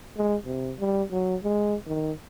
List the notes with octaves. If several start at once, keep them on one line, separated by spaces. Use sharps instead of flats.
G#3
C3
G3
F#3
G#3
D#3